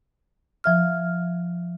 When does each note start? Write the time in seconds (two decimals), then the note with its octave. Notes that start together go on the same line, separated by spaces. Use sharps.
0.64 F3 E5 F6